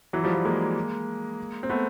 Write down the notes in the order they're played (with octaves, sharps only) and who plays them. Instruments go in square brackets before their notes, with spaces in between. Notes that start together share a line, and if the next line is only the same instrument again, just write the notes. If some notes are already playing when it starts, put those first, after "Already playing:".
[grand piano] E3 F#3
F3 G3
F3 G3
G#3 A#3
C4
A3 B3